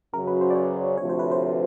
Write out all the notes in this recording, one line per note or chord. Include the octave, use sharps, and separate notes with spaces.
F#2 C#3 F#3 A#4
B4
C5
D5
C#5
D2 C3 F3 A3 C#5
C5
B4
C5